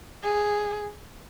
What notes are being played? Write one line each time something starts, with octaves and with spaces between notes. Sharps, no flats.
G#4